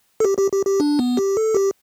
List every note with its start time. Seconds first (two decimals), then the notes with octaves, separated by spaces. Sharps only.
0.20 A4
0.25 G4
0.38 G4
0.52 G4
0.66 G4
0.80 D4
0.99 B3
1.17 G4
1.37 A4
1.54 G4